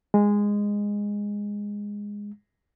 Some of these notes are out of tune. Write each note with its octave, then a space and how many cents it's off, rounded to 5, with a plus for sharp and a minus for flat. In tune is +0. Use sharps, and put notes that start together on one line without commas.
G#3 -15